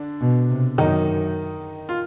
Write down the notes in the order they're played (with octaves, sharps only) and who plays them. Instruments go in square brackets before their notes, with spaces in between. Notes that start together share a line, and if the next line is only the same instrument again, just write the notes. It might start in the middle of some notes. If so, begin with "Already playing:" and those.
Already playing: [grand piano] D3 D4
[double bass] B2
C3
[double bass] F#2 [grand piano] D#3 D#4
[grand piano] F4